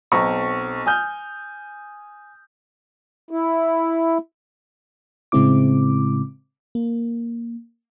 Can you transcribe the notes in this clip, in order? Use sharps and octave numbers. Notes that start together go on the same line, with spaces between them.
B1 C4 A#5 C#6
G#5 D#6 F6 G6
E4
A2 C#3 G#3 C4 E4 D6
A#3